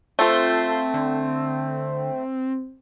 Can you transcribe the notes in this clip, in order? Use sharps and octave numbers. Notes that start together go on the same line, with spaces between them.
A3 C4 F4 A4 C6 G6
D3